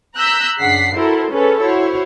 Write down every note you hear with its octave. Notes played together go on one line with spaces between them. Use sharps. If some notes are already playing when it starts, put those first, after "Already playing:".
A#5 E6 F#6 G6 B6
F#2 C#3 D4 F#5 B6 C7
E4 F#4 A4 A#4 C5
C#4 G#4 A4 B4
E4 F#4 C5 C#5